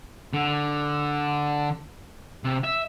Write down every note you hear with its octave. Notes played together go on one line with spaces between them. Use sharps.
D3
C3
E5